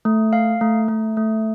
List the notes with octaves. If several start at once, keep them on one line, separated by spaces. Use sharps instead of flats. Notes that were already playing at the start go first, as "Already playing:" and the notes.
A3
F5
A3
A3
A3